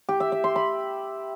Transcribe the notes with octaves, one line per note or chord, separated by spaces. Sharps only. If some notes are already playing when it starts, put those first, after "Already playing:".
G4
E5
E5
C6
B5